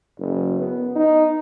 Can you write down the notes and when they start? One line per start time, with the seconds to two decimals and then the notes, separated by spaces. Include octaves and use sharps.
0.19 F#1
0.60 B3
0.96 D#4